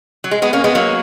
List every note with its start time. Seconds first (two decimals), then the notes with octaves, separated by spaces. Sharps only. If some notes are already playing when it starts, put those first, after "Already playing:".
0.24 F#3
0.31 G#3
0.42 G#3 B3
0.53 A#3 C#4
0.64 G#3 B3
0.75 F#3 A#3